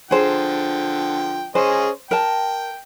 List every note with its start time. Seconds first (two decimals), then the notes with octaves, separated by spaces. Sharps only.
0.11 D3 F3 G#4 C5 G5
1.55 C#4 G#4 C5 D#5
2.11 A#4 G5 A5